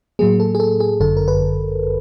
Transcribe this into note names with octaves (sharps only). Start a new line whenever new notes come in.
A2 F#3 A#3 G#4
A4
G#4
A4
G#4
G1 F#2 D3 A4
A#4
B4